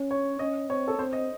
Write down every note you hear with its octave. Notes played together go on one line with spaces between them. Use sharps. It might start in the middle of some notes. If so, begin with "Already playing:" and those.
Already playing: C#4
C#5
C#4 D#5
C4 C#5
A4
C4 C5
D#5